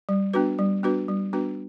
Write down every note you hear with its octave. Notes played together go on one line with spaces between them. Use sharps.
G3
B3 D4 F#4 B4
G3
B3 D4 F#4 B4
G3
B3 D4 F#4 B4